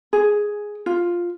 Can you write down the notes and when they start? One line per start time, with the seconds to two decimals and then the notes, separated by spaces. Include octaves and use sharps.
0.13 G#4
0.86 F4